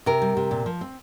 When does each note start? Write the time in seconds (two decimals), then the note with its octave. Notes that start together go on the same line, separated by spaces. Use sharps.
0.06 C3 A#4
0.22 G3
0.37 C3
0.51 A#2
0.66 F3
0.81 C4